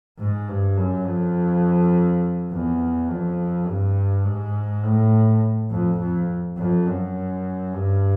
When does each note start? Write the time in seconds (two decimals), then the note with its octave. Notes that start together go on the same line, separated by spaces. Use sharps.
0.19 G#2
0.49 G2
0.77 F#2
1.06 F2
2.51 E2
3.09 F2
3.67 G2
4.25 G#2
4.84 A2
5.70 F2
6.00 F2
6.58 F2
6.87 F#2
7.74 G2